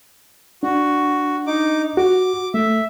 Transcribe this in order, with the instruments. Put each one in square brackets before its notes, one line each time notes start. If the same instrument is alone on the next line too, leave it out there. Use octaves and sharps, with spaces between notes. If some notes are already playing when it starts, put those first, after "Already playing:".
[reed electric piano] D4 [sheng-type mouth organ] F#4
[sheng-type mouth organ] D#4 D6
[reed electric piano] F#4 [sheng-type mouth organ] D6
[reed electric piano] A3 [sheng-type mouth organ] E5